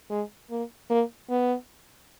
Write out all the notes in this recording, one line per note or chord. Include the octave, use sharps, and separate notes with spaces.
G#3
A#3
A#3
B3